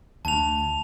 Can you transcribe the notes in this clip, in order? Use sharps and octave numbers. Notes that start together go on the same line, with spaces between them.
D2 A5 F7